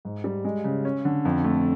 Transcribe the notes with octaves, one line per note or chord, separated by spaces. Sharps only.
G#2
G3
G#3
C#3
C#4
D3
F2
A3